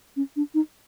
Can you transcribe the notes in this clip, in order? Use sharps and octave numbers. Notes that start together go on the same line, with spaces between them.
C#4
D4
D#4